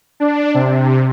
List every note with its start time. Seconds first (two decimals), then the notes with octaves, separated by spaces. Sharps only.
0.20 D4
0.54 C3